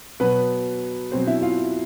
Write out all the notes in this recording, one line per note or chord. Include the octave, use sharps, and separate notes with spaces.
B2 F#3 B3 B4
B2 F#3 C4 C5
E4 E5
F4 F5